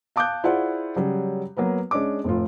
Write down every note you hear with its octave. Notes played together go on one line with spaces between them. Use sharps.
F5 A5 D6 D#6 F#6 G6
E4 F4 G#4 C5 D5 F#5
C#3 F#3 G3
F#3 A#3 B3 B4
G#3 C#4 D4 D#5 D6
F1 A2 F4